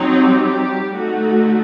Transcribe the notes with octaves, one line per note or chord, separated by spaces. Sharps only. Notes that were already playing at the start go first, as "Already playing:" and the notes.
Already playing: F#3 C4 D#4
G3 G4
D3 A3 D#4 F#4